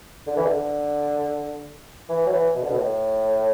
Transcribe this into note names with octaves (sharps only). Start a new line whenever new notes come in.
D3
E3
D3
E3
F#3
E3
B2
D3
B2
A2